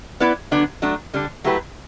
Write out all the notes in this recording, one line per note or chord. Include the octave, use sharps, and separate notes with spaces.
B3 E4 B4 D5
D3 F#3 B3 D4
F#3 A3 D4
D3 G3 D4
F#3 A3 E4 G4 B4